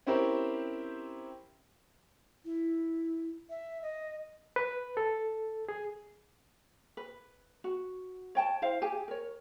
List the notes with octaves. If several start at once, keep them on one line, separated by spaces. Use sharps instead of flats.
C4 C#4 E4 G4 A#4 C5
E4
E5
D#5
B4
A4
G#4
B4
F#4
C#5 G5 A5
E4 C5 F5
G4 G#4 G#5
A#4 C#5